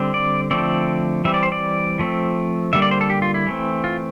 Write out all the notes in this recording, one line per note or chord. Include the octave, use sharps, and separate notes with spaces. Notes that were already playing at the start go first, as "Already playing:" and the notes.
Already playing: D3 G3 C4
D5
D3 F3 A3 C4 D5
E3 G3 C4 E5
D5
C5
D5
F3 A3 C4
D3 G3 A#3 E5
D5
C5
A4
G4
F4
E4
E3 A3 C4
F4